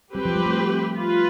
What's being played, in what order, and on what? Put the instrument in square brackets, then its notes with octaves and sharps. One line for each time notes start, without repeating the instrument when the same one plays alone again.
[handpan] G3 [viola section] C4 G4 B4
[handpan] F3
G3
A3
[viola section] F4 B4